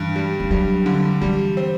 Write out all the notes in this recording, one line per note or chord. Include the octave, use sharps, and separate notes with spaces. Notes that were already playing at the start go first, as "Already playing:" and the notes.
Already playing: G2 E3
G3
E3
F#3 G3
D3
E3 G3
C4